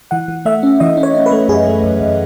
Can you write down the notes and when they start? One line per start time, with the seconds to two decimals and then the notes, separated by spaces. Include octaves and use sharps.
0.11 E3 F#5
0.28 E3
0.45 A3 E5
0.63 C#4
0.80 E3 D#5
0.97 C#4
1.03 C#5
1.15 C#4
1.26 B4
1.31 A3
1.49 F#2 G#4
1.67 A3
1.83 F#2
2.00 F#2